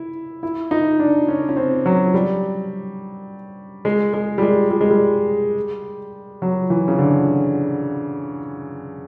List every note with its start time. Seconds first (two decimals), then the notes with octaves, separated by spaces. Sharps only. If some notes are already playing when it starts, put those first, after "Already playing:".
Already playing: E4
0.43 E4
0.71 D#4
0.99 D4
1.28 C#4
1.49 C#4
1.57 C4
1.86 F#3
2.14 G3
3.85 G#3
4.14 G#3
4.38 G3
4.42 G#3
4.71 G3
4.81 G#3
4.91 G3
6.42 F#3
6.70 E3
6.88 C#3
6.99 D3